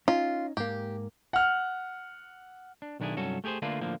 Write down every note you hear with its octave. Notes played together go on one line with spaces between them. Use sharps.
C#4 D#4 F4
G#2 A#3 G4
F#5 F6
D4
B1 D#3 D4 E4 G#4
C2 G2 F#3 C#4 F#4 A4
A3 G4 G#4 A#4 C5
D3 A3 A#3 D4 F4 B4
A2 D3 F3 A#3